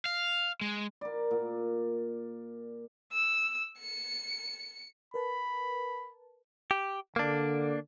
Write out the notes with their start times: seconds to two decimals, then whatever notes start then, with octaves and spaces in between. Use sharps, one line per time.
0.06 F5
0.61 G#3
1.01 A#4 D5
1.31 A#2
3.13 E6
3.78 C#7
5.14 A#4 B4 A5 B5
6.71 G4
7.16 D3 A#3 D4